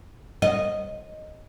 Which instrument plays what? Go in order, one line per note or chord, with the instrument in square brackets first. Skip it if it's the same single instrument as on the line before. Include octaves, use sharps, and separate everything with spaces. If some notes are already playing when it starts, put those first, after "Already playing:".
[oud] D#5